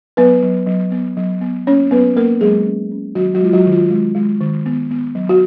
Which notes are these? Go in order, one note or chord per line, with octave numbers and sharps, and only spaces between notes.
F#3 B3 B4
F#3
F#3
B3
F#3
B3
A#3 C#4 C#5
F#3 B3 B4
A#3 A#4
F#3 G#3 G#4
C#4
C#4
D#3 F#3 F#4
F#3 F#4
G#3 F4
F#3 F#4
D#3
F4
G#3
G#3
D#3
B3
B3
F#3
F#4